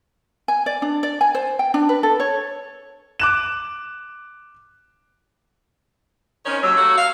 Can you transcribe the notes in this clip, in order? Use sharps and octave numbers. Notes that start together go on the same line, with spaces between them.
G#5
D5
D4
D5
G#5
C5
G5
D4
B4
A4
C#5
D6 F#6 E7
D#3 C4 C#4
D#2 F#3 E6
A3 A#3 F#4
F5